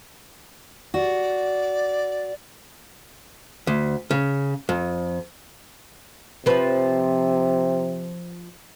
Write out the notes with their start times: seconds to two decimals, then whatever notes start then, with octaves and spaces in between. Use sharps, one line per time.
0.94 F#4 D5
3.67 D2
4.11 C#3
4.69 F2
6.46 C3 F3 B4